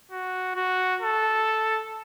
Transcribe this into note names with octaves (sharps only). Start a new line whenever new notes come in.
F#4
F#4
A4